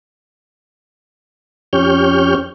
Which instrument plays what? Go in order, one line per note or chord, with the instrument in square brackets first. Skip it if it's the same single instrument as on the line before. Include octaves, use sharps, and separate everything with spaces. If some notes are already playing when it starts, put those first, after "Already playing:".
[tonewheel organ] F2 C#4 G4 C#5 F6 G6